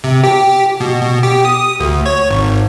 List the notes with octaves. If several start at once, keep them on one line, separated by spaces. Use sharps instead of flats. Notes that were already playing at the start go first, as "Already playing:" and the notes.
C3
G4
B2
B2
G4
D#6
D2
C#5
G#1